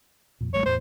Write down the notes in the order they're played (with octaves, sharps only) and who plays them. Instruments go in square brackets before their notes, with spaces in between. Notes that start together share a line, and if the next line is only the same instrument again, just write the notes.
[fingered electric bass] F2 A#2
[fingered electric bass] A1 G3 A3 [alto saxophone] C#5
[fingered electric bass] E2 A2 [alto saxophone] C5